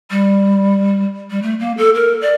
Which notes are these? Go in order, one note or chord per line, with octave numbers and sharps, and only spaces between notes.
G3
G3
A3
A#3
A4
A#4
D5